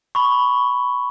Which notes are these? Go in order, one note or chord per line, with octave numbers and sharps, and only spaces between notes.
B5 C#6